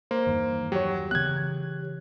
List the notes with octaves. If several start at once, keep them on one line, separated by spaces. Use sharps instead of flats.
A#3 C5
E2 G2 D#3
F#3 G4 C#5
C#3 E3 B3 F#6 G#6